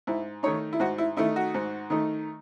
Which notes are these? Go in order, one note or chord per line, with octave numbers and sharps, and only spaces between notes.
G#2 E4
D#3 A3 D#4 C#5
E4
G#2 F#4
E4
D#3 A3 D#4 E4
F#4
G#2
D#3 A3 D#4